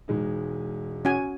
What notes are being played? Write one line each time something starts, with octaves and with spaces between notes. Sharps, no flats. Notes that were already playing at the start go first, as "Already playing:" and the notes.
E1 G#3 D#4
C#4 F#4 G#5